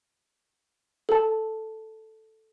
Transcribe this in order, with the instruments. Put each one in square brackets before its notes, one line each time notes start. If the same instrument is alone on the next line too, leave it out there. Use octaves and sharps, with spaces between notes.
[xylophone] A4 A5